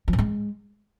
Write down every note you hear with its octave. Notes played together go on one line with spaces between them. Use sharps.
F3
A2
G#3